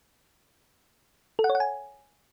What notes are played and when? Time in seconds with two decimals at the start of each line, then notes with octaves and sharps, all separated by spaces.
1.39 A4
1.44 F#5
1.50 C#5
1.55 F#5
1.60 G#5